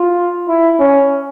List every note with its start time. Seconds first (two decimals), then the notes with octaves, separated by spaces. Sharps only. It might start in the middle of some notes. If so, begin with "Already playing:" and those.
Already playing: F4
0.48 E4
0.80 C#4